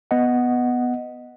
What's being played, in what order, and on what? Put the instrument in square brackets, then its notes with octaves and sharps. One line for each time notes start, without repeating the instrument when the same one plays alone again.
[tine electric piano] B3 D#5 F#5